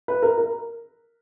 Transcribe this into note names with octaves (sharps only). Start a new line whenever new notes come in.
B4
A#4
A#4